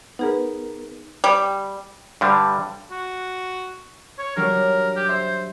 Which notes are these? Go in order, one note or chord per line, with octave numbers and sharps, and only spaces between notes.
B3 D#4 G#4 A#4 B4
G3
G2 D3 G3
F#4
C#5
F#3 G3 D4 A#4
G4
C5 E5